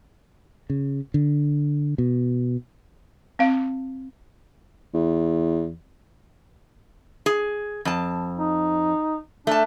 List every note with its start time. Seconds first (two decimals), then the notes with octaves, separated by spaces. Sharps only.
0.70 C#3
1.14 D3
1.98 B2
3.39 C4 F5
4.94 E2
7.26 G#4
7.85 F2 A5
8.38 D#4
9.47 A3 D4 A5